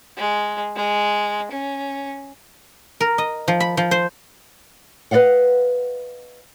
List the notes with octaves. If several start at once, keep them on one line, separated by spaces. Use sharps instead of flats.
G#3
G#3
C#4
A#4
D#5
F3
B5
F3
C5
B4 D5 D#5 F5 F#5